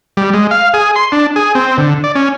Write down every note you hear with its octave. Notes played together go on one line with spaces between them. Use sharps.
G3
G#3
F5
G#4
C6
D4
G#4
C4
D3
D5
C#4